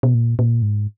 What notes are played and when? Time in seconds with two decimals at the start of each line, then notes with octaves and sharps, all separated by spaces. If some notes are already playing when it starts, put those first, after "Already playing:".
0.03 B2
0.14 A#2
0.39 A#2
0.62 G#2